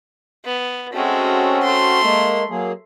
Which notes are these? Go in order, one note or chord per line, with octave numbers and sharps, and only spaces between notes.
B3
G#3 A3 C4 C#4 F#4
A3 C6
G#3 A#3
F#3 A#3 G#4